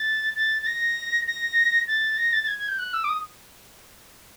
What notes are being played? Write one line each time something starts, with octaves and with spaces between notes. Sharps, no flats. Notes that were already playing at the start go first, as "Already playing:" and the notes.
Already playing: A6
A6
A6
A#6
A#6
A6
A#6
A6
A6
G#6
G#6
G6
F#6
E6
D6
D#6